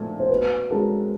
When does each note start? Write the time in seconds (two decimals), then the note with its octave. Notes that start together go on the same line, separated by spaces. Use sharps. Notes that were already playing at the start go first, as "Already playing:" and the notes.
Already playing: A#2 F3 A3
0.20 C5
0.29 B2 B4
0.70 G#3 C#4 F#4 A4 A#4